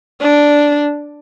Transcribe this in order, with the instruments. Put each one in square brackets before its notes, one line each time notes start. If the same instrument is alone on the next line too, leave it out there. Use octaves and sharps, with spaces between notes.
[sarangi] D4